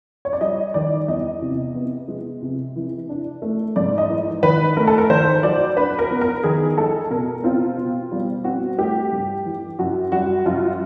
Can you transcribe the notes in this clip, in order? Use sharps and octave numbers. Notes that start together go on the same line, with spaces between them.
C#5
D5
G3 D#5
D#3 D5
E2 D#5
C3
B3
G#3
C3
E3
D4
A3
G#2 D5
D#5
E3
D#3 B4
A3 A#4
A4
A#4
D#3 C5
F#3 D5
D4 B4
A#4
B3
A#4
D#3 G#4
G#3 A4
B2 A#4
C4 F4
B2
G3
C4 F#4
A3 G4
G2
E3
F#2 F#4
G3 F#4
F#2 F4